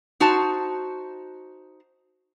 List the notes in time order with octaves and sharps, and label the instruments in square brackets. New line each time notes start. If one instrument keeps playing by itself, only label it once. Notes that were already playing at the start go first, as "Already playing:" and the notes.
[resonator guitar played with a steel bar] D#4 F#4 C5 A5